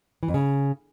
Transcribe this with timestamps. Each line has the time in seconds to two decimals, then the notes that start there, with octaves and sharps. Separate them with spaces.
0.23 E3
0.28 F2
0.34 C#3